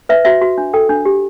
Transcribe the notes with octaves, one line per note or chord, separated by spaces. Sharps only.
B4 E5
F#4 E5
F#4
D4
A4 G5
D4
G4